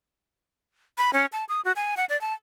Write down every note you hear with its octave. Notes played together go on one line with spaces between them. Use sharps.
B5
C#4
A5
D#6
F#4
G#5
F#5
D5
A5